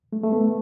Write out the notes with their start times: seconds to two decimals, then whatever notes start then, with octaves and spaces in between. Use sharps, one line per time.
0.12 A3
0.23 A3
0.32 B3